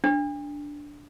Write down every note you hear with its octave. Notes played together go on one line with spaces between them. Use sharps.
D4